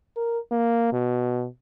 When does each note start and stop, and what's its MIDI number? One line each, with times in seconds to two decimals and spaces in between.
0.17 0.39 70
0.51 0.92 58
0.93 1.47 47